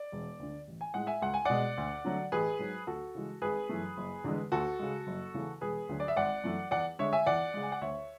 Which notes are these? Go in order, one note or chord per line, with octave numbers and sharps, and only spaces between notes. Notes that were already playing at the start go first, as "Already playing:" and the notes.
Already playing: D5
E1
D2 D3
A1
G#5
A2 G#3 F#5
E5 G#5
C#2 F#5
G#5
B2 G#3 D5 F#5
D2
D3 F#3 A3
A1 G#4 B4
G#2 F#3
D2 F#4 A4
C#3 E3 G#3
G#1 G#4 B4
F#2 E3 A3
F#1
E2 D3 G#3
D2 F#4 A4
C#3 G#3
F#1
E2 C#3 E3 A3
E1 G#4 B4
D2 D3 F#3
D5
E5
G#1 D5 F#5
F#2 E3 A3
E2 D5 F#5
D3 G#3 C#5 E5
E5 G#5
E2 D5 F#5
C#3 G#3
G#5
F#5
D2 C#5 E5